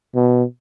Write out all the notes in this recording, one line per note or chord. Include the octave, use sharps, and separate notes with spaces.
B2